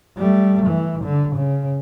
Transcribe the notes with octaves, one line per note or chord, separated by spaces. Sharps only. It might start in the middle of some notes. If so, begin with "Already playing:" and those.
G3 A3
E3
D3
C#3